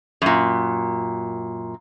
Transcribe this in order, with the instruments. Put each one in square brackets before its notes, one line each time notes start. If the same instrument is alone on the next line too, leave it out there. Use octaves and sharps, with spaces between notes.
[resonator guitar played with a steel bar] F#2 A#2